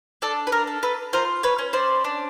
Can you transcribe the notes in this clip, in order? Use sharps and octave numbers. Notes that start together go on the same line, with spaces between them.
D4 A4
B4
A#4
A4
A4 B4
F4 A#4 C5
B4 C#5
C#4
C5 D5
D4